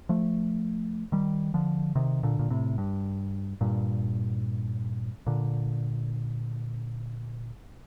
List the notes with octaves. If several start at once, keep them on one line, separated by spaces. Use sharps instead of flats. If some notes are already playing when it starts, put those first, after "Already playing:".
F3 A3
D#3 G3
D3 F3
C3 D#3
A#2 D3
A#2
A2 C3
G2
G2 A#2
A#2 D3